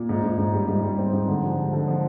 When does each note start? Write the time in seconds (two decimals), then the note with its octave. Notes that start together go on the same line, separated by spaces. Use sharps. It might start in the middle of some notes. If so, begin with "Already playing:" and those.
Already playing: A#2
0.09 G#2
0.23 G#2
0.38 G#2
0.53 G3
0.68 G#2
0.83 G3
0.98 C4
1.13 G#2
1.27 D3
1.43 F3
1.58 F3
1.73 D3
1.88 F3